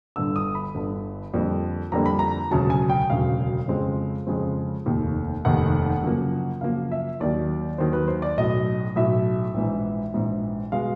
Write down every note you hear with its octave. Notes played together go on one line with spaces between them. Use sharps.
G1 G2 D3 E6
D#6
B5
G1 G2 D3
F2 D3 G3 A#3
F2 D3 G3 A#3 A#5
B5
A#5
E1 D2 C#3 F#3 A5
G#5
G5
E1 D2 C#3 F#3 F5
F2 C#3 F3 G#3 C4
F2 C#3 F3 G#3 C4
F1 D#2 D#3
F1 D#2 D#3 F#5
F#2 C#3 F3 A#3
F#2 C#3 F3 A#3 F5
E5
D#2 D#3 F#3 D5
D#2 D#3 F#3 C5
B4
C5
D5
B1 A2 F#3 D#5
B1 A2 F#3 E5
A#1 G#2 E3
A#1 G#2 E3
B2 G#3 F5